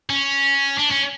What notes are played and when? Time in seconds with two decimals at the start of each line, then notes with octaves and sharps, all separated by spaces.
0.10 C#4
0.79 D4
0.92 C#4